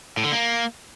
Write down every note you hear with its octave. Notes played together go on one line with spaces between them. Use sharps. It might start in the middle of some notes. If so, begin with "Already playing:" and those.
A2
D3
A#3